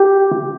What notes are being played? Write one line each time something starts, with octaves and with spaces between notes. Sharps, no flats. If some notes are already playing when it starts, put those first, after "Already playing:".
Already playing: G4